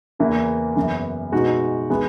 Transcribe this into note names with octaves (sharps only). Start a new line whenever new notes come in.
E2 C#3 E3 A#3 E4
F#2 C#3 E3 B3
B2 G#3 D#4 F#4
E3 G#3 B3